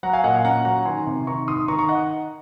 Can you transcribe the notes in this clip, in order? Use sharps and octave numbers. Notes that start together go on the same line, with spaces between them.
F#3 F#5 A#5
F5 G#5
A#2 D#5 F#5
F5 G#5
C#4 F#5 A#5
F#3 F#5 A#5
D#3 G#5 C6
C3
D#3 A#5 C#6
G#2 C6 D#6
D#3 A#5 C#6
A#5 C#6
D#5 F#5